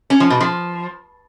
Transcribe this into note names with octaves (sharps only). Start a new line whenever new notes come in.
C#4
F3
B2
F3